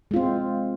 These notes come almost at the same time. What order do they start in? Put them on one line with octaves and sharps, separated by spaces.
G#3 F4 C4